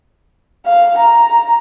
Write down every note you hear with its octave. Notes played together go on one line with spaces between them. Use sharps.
F5
A#5